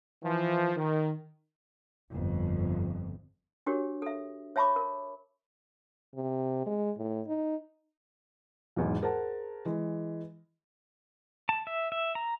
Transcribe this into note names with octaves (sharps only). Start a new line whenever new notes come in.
E3 F3
D#3
G1 F2
D4 F#4 G4 A#4 C#5
A4 E5
C#5 E5 A5 B5 C#6 D6
A#4
C3
G#3
A2
D#4
B1 E2 G#2
G#4 A#4 C5 F#5 A5
E3 G#3
A5
E5
E5
A#5